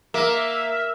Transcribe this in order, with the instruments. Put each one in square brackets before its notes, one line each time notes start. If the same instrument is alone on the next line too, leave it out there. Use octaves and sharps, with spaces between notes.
[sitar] A#3 [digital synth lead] E5